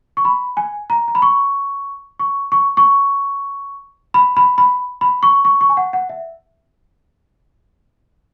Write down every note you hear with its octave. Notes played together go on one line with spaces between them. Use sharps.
C#6
B5
G#5
A#5
A#5
B5
C#6
C#6
C#6
C#6
B5
B5
B5
B5
C#6
C#6
C#6
G#5
F#5
F#5
E5